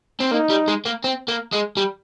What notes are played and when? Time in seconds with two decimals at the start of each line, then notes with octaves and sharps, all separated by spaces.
0.20 C4
0.31 A#3 D#4
0.50 G3
0.68 G#3
0.86 A#3
1.04 C4
1.28 A#3
1.52 G#3
1.77 G3